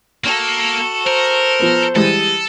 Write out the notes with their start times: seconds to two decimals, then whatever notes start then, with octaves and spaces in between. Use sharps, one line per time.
0.24 A#3 F#4 A4
1.06 A#4 C5
1.60 F3 B3
1.96 E3 G3 G#3 A4 D#6